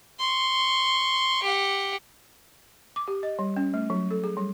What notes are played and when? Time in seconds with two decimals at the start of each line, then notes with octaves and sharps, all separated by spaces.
0.19 C6 C#6
1.43 G4 F#5
2.96 D6
3.08 G4
3.23 D#5
3.39 G3
3.57 C#4
3.74 A3
3.90 F#3
4.11 A4
4.24 G#4
4.37 G3